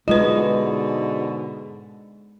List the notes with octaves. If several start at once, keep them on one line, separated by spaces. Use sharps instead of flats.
G#2 B2 D3 G#3 F4 B4 D#5